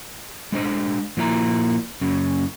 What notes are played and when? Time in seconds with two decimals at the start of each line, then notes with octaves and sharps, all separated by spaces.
0.52 G#3 D4 C5 D#5
1.17 A#2 F3 A#3 E4 C5 A#5
2.01 F#2 C#3